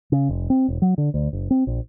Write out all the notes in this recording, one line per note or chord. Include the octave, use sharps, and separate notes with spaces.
C#3
F1
C4
E1
F#3
D3
D2
F#1
C4
A#1